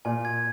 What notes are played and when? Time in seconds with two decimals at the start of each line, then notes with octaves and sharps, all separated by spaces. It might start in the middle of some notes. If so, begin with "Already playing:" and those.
0.05 A#2 G#5
0.25 G#6